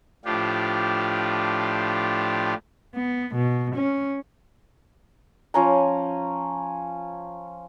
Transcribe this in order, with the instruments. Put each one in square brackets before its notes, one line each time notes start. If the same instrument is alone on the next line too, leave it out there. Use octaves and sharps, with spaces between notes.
[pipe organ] A2 F3 D4 F4 G4
[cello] B3
B2
C#4
[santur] F3 C#4 A#5